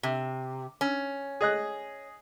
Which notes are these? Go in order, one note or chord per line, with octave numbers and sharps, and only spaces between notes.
C3
C#4
G#4 D#5 F#6